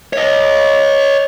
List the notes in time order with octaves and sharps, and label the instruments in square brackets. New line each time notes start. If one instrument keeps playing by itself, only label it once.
[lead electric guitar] C#5 D#5